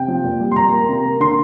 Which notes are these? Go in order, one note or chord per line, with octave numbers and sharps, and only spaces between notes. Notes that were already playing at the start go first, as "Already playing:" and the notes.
Already playing: C3 G5
F3
A#2
G3
C6
A#2 A#5
A#3
C3
A#3
D3 C6